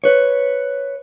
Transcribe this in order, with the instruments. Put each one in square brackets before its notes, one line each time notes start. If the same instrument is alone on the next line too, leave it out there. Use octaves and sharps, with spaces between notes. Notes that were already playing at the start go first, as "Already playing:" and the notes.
[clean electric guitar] B4 C#5